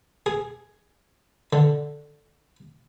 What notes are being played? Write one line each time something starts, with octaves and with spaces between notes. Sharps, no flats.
G#4
D3